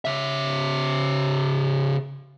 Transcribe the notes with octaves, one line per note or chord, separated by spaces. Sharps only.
C#3 E5